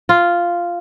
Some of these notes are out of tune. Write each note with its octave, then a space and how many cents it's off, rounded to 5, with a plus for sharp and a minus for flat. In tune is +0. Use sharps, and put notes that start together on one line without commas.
F4 -5